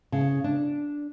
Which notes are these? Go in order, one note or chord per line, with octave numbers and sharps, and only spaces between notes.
C#3
D4